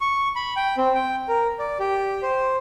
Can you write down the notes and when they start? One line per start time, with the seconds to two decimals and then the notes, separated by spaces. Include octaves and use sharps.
0.01 C#6
0.36 B5
0.56 G5
0.77 C4
0.95 G5
1.28 A#4
1.59 D5
1.80 G4
2.23 C5